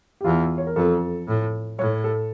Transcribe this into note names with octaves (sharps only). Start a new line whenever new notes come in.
G4
E2 F4
C#5
A#4
F2 A4
A2
A2 C#5
A4